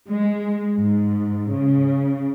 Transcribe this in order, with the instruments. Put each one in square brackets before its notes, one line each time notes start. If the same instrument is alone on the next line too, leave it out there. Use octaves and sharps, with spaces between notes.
[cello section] G#3
G#2
C#3